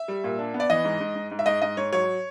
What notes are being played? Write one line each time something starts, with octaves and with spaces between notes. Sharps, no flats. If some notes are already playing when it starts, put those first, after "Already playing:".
Already playing: E5
G3
A#2
D4
B3
D5
E3 D#5
G#2
G#2
G#2
G#2
E5
G#2 D#5
G#2 D#5
G#2 C#5
F#3 C#5